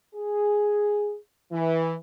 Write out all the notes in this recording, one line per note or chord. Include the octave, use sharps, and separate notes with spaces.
G#4
E3